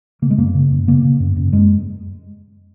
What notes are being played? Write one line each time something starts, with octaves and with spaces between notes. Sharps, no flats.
C#3 A#3
G#3
F#2 A#3
C#3
F#2
C#3 A#3
C#3
F#2
F#2
F#2 G#3